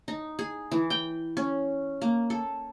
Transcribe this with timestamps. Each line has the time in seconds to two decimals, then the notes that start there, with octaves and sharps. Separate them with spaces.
0.08 D#4
0.39 G#4
0.72 E3
0.90 G5
1.37 C#4
2.02 A#3
2.30 A4